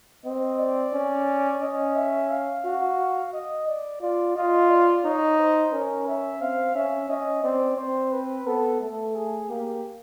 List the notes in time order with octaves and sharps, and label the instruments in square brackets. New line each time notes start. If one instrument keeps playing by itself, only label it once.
[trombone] C4 [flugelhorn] D#5
[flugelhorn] D5
[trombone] C#4
[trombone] C#4 [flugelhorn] D#5
[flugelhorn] E5
F5
[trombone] F#4
[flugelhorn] D#5
D5
[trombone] F4 [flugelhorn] D5
[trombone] F4 [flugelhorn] D#5
[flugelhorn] D5
[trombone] D#4 [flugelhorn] C#5
[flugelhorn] C5
[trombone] C#4 [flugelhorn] A#4
[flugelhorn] E5
[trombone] C4 [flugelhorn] F5
[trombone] C#4 [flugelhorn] E5
[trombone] C#4 [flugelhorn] D#5
[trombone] C4 [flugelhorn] D5
[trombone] C4 [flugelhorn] C5
[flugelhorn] B4
[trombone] B3 [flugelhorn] A4
[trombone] A3 [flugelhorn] A4
[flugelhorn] G#4
[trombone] A#3 [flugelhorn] G4